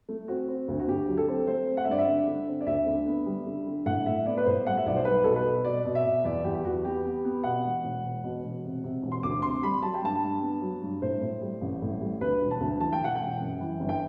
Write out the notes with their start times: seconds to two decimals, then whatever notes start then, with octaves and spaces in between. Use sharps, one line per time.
0.09 A3
0.28 C4 F#4
0.48 C4
0.68 D2
0.79 F#4
0.88 D2 G4
1.08 F#3
1.17 A4
1.28 C4
1.47 A3 C5
1.67 C4
1.77 F#5
1.84 E5
1.88 G2 D5
1.98 E5
2.08 D3
2.28 D3
2.48 C4
2.61 D5
2.66 D2 E5
2.87 D3
3.07 B3
3.26 G3
3.46 D3
3.67 D3
3.86 A2 F#5
4.06 A2 E5
4.26 B3 D5
4.37 B4
4.46 A2 C5
4.66 G3 F#5
4.77 E5
4.86 B1 D5
4.96 C5
5.05 G3 B4
5.24 B2 A4
5.36 B4
5.45 B2
5.65 B2 D5
5.85 B2
5.95 E5
6.05 B2
6.24 E2 D5
6.44 E2 G4
6.55 G4
6.65 E2 F#4
6.85 B3 G4
7.05 B3
7.24 B3
7.44 B2 F#5
7.64 E1
7.84 E1
8.04 E1
8.24 B2
8.44 E1
8.64 C3
8.84 C3
9.03 E1
9.12 C6
9.23 D2 D6
9.42 C3 C6
9.63 G3 B5
9.82 F#3 A5
9.94 G5
10.02 G2 A5
10.22 G2
10.42 B3
10.62 F#3
10.82 G2
11.02 A2 C5
11.21 A2
11.42 G3
11.61 A1
11.82 A2
12.01 G3
12.21 D2 B4
12.42 E1
12.51 A5
12.60 D2
12.80 E3 A5
12.93 G5
13.00 E1 F#5
13.16 G5
13.21 E1
13.40 F#2
13.61 E3
13.80 G1
13.89 G5